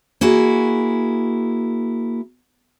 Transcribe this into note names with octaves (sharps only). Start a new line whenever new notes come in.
A#3 E4 F#4 G#4